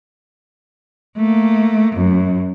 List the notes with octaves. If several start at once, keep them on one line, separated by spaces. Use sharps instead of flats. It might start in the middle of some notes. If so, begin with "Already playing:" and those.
A3 A#3
F#2